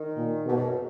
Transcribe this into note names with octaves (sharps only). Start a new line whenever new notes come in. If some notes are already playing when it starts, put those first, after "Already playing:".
Already playing: D#3
A#2
G#2 B2
F#2